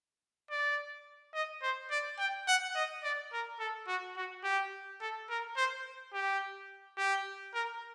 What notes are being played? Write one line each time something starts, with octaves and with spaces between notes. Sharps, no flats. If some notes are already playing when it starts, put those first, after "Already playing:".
D5
D#5
C5
D5
G5
F#5
D#5
D5
A#4
A4
F#4
F#4
G4
A4
A#4
C5
G4
G4
A#4